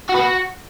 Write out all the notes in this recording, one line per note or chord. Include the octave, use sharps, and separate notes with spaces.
F#4
B4
F#4